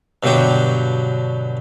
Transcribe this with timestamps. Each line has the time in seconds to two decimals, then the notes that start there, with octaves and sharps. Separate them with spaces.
0.23 G2 B2 D3 F#3 G4